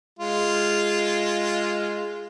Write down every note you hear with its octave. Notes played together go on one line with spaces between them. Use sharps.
G#3 F4